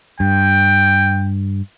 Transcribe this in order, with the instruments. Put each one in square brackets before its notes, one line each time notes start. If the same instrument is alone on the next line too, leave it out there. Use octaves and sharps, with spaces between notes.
[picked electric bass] G2 [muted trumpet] G5